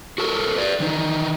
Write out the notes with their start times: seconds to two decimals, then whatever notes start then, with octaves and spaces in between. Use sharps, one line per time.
0.18 F#4 A4 A#4
0.56 B4 D5
0.80 D#3 E3 D#4